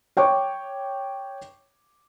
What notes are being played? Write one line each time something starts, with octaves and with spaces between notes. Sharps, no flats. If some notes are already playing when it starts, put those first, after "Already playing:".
C#5 G5 C#6 D6